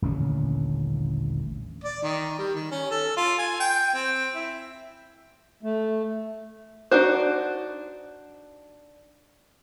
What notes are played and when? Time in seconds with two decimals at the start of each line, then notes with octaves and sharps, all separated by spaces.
0.02 D#1 A1 D3 C#4
1.84 D5
2.03 D#3
2.38 G3
2.55 D#3
2.71 C#4
2.91 A4
3.17 F4
3.39 G#5
3.60 G5
3.94 C4
4.35 E4
5.63 A3
6.91 D4 D#4 F#4 C5